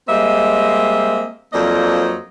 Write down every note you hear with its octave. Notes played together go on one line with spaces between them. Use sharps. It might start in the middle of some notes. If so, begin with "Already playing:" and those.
G3 G#3 A#3 C4 D#5 E5
F2 F#3 A#3 D4 C5 D#5